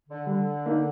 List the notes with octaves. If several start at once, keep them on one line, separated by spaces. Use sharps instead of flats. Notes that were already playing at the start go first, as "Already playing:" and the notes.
D3
D3 G3
A#3 D#4